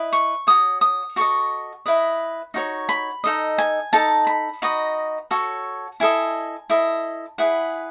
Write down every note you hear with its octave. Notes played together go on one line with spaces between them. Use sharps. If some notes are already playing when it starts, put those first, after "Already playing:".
Already playing: E4 B4 D#5
C#6
F#4 C#5 D#6
D#6
F#4 A4 D#5 C#6
E4 B4 D#5
D#4 F#4 C#5
B5
D#4 A4 D#5
G#5
D#4 A4 D#5 A5
B5
D#4 F#4 B4 D#5
F#4 A4 C#5
E4 A4 D#5 G#5
E4 A4 D#5
E4 G#4 B4 F#5